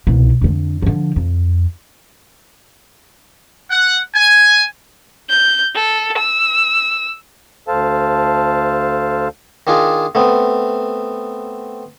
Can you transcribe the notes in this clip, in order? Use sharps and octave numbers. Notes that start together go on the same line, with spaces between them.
C2 B2
F2 D3
D3 F3
F2
F#5
G#5
G6
A4
E6
D2 A4 C5 F5 A5
D#3 D4 F4 G#4
A3 B3 C4